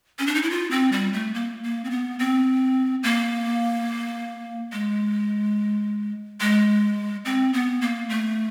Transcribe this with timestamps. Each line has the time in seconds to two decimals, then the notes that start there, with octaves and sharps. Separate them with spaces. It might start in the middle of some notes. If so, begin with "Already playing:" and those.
0.19 C#4
0.27 D4
0.35 D#4
0.42 E4
0.50 F4
0.71 C4
0.92 G3
1.13 A3
1.35 A#3
1.63 A#3
1.84 C4
1.91 B3
2.19 C4
3.03 A#3
4.72 G#3
6.41 G#3
7.25 C4
7.53 B3
7.82 A#3
8.09 A3